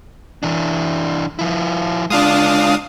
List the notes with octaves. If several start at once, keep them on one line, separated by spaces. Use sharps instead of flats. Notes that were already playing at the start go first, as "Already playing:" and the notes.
E3 D4
F3 E4
G#3 D4 F4 F5 D#6